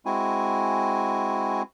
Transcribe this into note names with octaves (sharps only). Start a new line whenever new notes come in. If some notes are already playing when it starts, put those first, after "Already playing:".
G#3 C4 E4 F#4 G#5